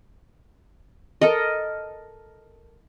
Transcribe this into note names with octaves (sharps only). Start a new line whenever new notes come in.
A4 A#4 D#5